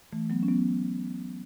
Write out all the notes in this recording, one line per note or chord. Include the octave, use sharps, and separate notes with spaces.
E3 A3
F#3 B3
C#4
F#3 B3